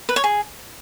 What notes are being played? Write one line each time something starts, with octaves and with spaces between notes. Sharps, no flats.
B4
C#5
G#4